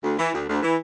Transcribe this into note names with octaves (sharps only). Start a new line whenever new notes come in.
D2
E3
D2
D2
E3